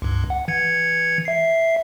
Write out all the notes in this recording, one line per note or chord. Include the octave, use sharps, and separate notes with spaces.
C#2 G2
F#5
E3 G#6 C#7
E5 C7